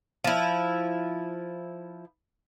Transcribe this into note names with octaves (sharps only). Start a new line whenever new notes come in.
F3 E4